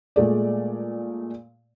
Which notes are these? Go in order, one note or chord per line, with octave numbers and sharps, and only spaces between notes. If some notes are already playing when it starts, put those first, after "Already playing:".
A#2 G#3 A3 D5